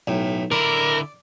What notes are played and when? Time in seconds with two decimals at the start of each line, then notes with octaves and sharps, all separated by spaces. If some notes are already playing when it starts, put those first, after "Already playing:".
0.07 B1 A2
0.51 D3 E4 A#4 D5